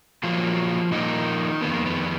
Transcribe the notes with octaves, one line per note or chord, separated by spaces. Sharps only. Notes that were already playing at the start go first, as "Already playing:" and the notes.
A#2 F3 F#3 A#3 F4
A#2 D#3 F3 A#3 D#4
F2 D#3 A#3 B3
A#3
B3